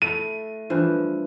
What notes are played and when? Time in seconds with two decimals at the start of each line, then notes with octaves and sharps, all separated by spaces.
0.02 A3 E4 D#7
0.70 G2 E3 F3